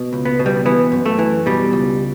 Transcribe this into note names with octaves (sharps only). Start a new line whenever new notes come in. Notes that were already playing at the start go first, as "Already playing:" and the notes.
Already playing: B2
C#2
B3
B2
G3
E3 B3
F#2
A3
E3
B2 G3
C#2